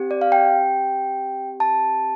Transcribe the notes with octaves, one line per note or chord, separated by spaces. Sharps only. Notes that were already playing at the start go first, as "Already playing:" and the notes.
Already playing: C4 G4
D5
F5
G5
A5